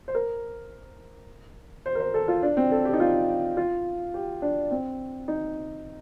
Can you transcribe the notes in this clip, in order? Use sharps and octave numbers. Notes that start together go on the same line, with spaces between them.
C5
A#4
C5
A#4
C5
A4
F4
D4
C4
A4
G4
D#4
F4
F4
G4
D4
C4
D#4